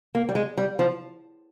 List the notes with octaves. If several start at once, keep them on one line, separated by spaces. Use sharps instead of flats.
A#3
G3
G#3
G3
F3